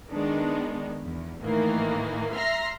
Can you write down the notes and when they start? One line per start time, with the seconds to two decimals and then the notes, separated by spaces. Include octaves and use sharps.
0.11 D#3 G#3 B3 D4
1.01 E2
1.43 A2 D#3 E3 A#3
2.34 E5 A#5 C6 F6 A#6 C7